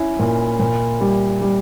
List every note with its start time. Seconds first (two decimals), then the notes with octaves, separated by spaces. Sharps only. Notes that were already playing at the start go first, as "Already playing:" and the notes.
Already playing: C#4 E4
0.19 A#2
0.59 A#2
1.01 G3
1.41 G3